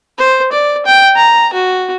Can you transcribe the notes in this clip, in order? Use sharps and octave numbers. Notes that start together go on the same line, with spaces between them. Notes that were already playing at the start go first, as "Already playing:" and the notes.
C5
D5
G5
A#5
F#4